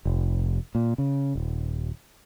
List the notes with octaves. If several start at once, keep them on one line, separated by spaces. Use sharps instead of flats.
F1
A#2
C#3
D#1